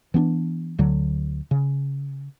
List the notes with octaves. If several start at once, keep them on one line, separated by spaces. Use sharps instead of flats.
E3 B3 C#4 D4
D2 D3 F#3
C#3